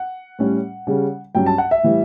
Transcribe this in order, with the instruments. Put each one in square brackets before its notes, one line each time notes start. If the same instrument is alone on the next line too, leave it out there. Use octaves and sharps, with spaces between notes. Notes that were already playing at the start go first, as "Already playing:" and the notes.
Already playing: [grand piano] F#5
A2 G3 C#4
C#3 G3 C#4
G2 F#3 C#4 G5
A5
F#5
E5
A2 E3 G3